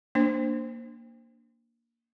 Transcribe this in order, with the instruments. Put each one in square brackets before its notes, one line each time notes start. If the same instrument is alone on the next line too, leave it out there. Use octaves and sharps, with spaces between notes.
[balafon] A#3 D4 C5